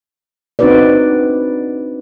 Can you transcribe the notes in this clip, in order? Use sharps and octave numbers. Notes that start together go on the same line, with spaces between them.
C4 D4 D#4 F#4 B4 D5